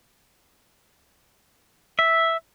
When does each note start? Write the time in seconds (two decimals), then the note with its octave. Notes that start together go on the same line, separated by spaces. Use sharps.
1.99 E5